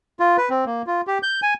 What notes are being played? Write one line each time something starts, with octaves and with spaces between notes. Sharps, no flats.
F4
B4
C4
A#3
F4
G4
G6
G#5